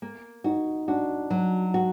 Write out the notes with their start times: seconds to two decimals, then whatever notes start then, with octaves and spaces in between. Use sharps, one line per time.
0.02 A#3
0.44 D#4 F#4
0.88 D4 F#4
1.30 F#3
1.74 F#4